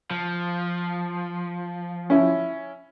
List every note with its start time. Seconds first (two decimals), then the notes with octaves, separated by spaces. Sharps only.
0.11 F3
2.10 C#4 E4